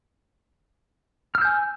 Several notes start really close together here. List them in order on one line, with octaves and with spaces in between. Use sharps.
F6 E6 G6 G#5